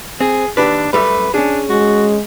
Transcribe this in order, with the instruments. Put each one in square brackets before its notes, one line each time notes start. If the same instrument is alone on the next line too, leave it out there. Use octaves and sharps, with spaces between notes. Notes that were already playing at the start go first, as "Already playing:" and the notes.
[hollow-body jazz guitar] C4 [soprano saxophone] G#4
[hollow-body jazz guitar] D#2 G4 B4 [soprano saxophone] D4
[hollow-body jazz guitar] F#2 G3 A3 [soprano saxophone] B4
[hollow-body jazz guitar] C#4 G#4 [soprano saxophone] D4
[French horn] G#3 [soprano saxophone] F#4